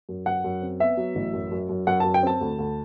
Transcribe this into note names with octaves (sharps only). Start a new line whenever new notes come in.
F#2
F#2 F#5
F#2
C4
B3 E5
F#3
A1
F#2
F#2
F#2
F#2 F#5
F#2 A5
G5
C4 A5
D2
D2